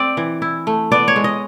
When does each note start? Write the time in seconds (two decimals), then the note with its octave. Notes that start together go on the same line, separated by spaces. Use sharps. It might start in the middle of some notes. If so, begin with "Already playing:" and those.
Already playing: C4 D5
0.17 E3
0.42 E4
0.67 A3
0.92 B3 D5
1.08 C#5
1.16 G#3
1.24 D#5